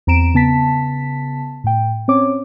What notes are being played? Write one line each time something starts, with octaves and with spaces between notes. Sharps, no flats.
E2 C4 A#5 D7 E7
C#3 B3 A5 B6
A2 G5
C4 C#4 C#5 D6